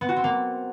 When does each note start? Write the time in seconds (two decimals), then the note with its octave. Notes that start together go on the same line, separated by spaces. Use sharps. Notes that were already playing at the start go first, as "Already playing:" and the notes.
0.01 B3
0.09 F#4
0.16 C4
0.24 A#3